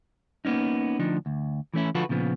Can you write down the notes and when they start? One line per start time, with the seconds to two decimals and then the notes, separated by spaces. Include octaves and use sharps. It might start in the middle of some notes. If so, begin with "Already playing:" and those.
0.45 A#3 B3 C#4 D#4
0.99 D2 F3 D4 D#4
1.26 D2
1.74 E3 A3 C#4 E4
1.95 D3 F3 F4 F#4 A4 B4
2.09 A#2 C#3 F3 B3